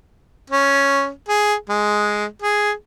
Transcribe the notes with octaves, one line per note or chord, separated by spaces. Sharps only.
C#4
G#4
G#3
G#4